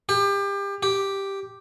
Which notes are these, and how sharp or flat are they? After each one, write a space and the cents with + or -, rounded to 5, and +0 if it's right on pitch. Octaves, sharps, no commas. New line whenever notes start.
G4 +30
G4 +0